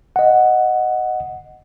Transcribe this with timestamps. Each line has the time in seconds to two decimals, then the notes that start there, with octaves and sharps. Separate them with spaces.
0.16 D#5 F#5